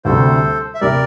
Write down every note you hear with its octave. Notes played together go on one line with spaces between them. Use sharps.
D2 C3 G3 A4 C5
E5
C3 G3 A#4 D5